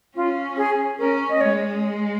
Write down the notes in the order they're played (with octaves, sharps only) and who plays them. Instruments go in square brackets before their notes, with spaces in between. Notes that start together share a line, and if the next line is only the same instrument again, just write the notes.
[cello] C#4 [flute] F4
[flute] G#4
[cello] C#4 [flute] A#4
[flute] D#5
[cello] G#3 [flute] C#5